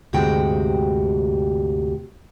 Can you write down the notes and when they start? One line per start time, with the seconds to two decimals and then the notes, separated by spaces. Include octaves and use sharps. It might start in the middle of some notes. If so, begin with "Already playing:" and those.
0.13 D2 G2 C3 G#3 F#4 G5